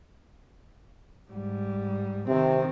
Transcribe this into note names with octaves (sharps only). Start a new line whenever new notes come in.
G#2 G3
C3 D#3 C4